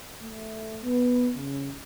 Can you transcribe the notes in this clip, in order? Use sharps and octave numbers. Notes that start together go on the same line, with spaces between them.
A3
B3
C#3